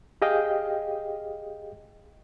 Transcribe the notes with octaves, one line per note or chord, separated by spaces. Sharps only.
G4 G#4 D#5 F5 G5